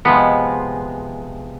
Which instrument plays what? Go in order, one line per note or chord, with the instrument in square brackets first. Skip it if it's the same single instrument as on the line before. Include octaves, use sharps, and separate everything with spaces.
[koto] C3 F3 G#3 B3